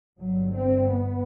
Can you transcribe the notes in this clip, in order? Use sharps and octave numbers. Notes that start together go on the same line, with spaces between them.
G1 G2 F#3
C4
B3